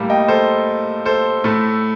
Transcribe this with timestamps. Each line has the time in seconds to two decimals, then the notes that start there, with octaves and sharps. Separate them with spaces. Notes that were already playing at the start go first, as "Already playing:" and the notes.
Already playing: A2 G3 A#3
0.10 D#5 G5
0.28 A4 C5
1.05 A4 C5
1.44 A2 A3 A4